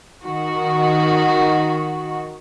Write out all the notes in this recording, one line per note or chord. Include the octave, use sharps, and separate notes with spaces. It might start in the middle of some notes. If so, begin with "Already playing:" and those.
D#3 F#4